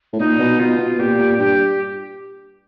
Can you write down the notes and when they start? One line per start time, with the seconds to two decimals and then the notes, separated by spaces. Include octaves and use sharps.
0.13 A2
0.19 A#2 D#4
0.39 B2
0.59 B2 F4
0.78 B2
0.99 A#2 G4
1.19 A#2
1.38 G2 G4